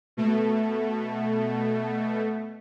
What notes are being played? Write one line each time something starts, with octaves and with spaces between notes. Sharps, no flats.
B2 A3